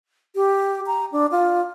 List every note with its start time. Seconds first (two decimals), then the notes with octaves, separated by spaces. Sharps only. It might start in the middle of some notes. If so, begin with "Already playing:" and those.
0.36 G4
0.87 A#5
1.12 D4
1.32 F4